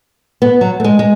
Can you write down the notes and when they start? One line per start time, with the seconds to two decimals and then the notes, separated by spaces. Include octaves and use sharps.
0.42 B3
0.61 F#3
0.80 A3
0.84 G#3
0.99 G#3